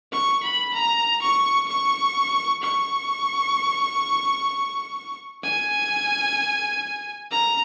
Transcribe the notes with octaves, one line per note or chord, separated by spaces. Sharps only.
C#6
B5
A#5
C#6
C#6
C#6
G#5
A#5